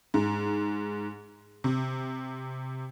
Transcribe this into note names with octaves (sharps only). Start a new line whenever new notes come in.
G#2
C3